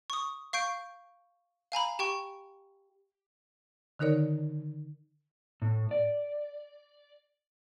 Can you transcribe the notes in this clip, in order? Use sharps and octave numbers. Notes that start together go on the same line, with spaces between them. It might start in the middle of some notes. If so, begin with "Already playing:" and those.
C#6 D#6
F5 C#6 G6 D7
F5 G#5 A#5 B5
G4 G5 C#6
D3 D#3 D#4 A#4 C#5 D5
A2
D5